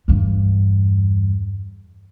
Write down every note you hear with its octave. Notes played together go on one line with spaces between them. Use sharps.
E2 G2